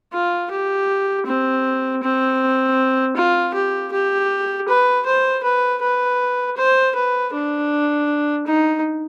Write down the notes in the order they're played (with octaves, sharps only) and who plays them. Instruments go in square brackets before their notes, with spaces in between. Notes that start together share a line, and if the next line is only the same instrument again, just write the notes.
[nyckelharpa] F4
G4
C4
C4
F4
G4
G4
B4
C5
B4
B4
C5
B4
D4
D#4